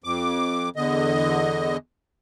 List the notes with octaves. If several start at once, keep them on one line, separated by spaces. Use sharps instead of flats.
F2 D6
E2 D3 D#5